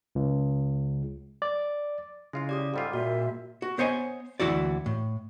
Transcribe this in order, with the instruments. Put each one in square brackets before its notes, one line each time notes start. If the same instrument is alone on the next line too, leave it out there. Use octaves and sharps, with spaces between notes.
[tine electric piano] C#2
D5
[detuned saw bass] C#3 [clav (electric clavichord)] G#3 F4 F5 [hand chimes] E4
[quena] G4 [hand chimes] D5 D6 D#6
[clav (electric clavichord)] G#2 G3 F4 [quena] A4
[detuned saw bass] A#2 [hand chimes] F#4 [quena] E5
[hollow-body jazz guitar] F#4
B3 C5 C#5 D#5 G#5
D2 C#3 E3 E4 F#4 D5
A2